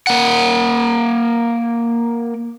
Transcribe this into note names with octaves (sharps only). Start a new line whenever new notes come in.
A#3 F#5